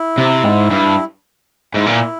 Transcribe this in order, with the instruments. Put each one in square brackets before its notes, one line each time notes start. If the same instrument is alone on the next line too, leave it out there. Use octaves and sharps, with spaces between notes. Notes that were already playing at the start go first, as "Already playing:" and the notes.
Already playing: [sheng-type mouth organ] E4
[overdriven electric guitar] C3
G#2
G2
[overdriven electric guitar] G#2 [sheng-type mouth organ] E4
[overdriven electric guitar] A#2